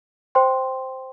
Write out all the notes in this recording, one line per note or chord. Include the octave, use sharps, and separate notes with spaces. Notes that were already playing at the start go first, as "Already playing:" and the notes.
C5 G5 C6